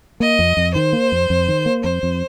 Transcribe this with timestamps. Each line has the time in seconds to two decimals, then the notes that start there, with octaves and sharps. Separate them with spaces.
0.20 A#3 D#5
0.39 F2
0.57 F2
0.74 D#3 C5
0.93 A#3
1.12 F2
1.30 F2
1.48 D#3
1.66 A#3
1.84 F2 C5
2.03 F2